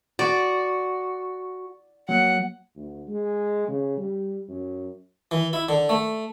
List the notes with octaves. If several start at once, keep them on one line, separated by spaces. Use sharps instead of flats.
F#4 D5
F#3 A#3 F#5
D2
G#3
C#3
G3
F#2
E3
E4
D3
A3